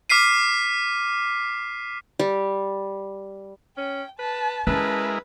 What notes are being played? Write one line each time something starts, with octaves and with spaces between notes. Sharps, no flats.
D6 F6 B6 C7 D#7
G3
C#4 G5
B4 A5
G#3 C#4 E4 A#4 B4 A5